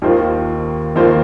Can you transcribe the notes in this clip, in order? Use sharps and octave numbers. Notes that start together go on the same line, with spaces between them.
D#2 D#3 A#3 F4 C5
D#2 D#3 A#3 F4 C5